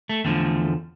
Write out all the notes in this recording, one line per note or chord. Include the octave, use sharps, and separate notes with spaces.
A3
E2 D3 F3 A3